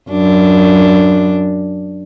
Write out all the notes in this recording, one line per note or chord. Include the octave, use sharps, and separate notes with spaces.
F#2 D4